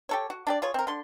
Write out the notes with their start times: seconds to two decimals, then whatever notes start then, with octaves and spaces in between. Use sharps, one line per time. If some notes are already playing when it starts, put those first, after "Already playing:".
0.09 G4 A4 C#5
0.30 F#4
0.47 D4 G4 D5
0.62 F4 G#4 C#5
0.74 C4 A#4
0.87 D3 C6